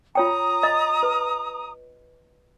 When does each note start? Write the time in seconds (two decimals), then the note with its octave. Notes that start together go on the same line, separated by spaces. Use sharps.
0.15 F4 C#5 G5 A#5 D#6
0.63 D#5
1.03 B4